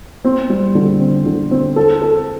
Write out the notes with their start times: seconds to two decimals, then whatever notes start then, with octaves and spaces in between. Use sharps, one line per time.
0.24 C4
0.50 G3
0.75 D3
1.00 C4
1.26 D3
1.51 C4
1.76 A4
2.02 A4